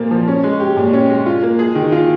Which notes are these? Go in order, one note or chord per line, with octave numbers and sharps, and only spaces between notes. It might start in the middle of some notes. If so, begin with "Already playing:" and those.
Already playing: A#2 F3 A#3
F3
C#4
G#3
G4
A#2
C#4
G#3
F4
A#3
G#4
D#3
F4